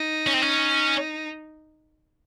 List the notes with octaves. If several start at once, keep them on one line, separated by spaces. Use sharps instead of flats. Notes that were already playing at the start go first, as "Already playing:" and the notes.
Already playing: D#4
C#4
C4
C#4